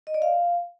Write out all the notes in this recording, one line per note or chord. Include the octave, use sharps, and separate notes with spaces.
D#5
D5
F5